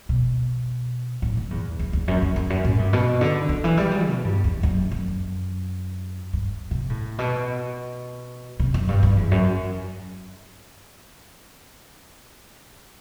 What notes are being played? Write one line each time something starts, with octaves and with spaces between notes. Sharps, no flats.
B2
A2
F#2
E2
E2
E2
F#2
F#2
E2
F#2
A2
G2
B2
D3
D3
E3
G3
F#3
B2
G2
E2
F#2
F#2
G2
C3
A2
B2
C3
F#2
G2
G2
E2
F#2